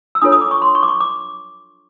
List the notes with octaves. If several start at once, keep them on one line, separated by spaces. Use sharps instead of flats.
E6
D4 F4 A4 C#5 D#6
D#6
D6
C#6
C6
C#6
D6
C#6
D6